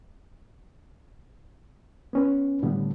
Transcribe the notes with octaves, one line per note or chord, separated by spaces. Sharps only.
B3 C#4 B4
A2 D3 G3 B3